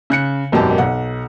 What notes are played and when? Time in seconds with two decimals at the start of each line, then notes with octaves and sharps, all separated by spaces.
0.10 C#3 F#6 C#7
0.52 G#1 F#2 B2 D#3 G4 A5
0.78 B1 F#5